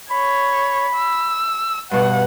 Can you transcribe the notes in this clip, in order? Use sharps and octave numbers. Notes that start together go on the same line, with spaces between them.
C#5 B5
E6
G2 B2 F#5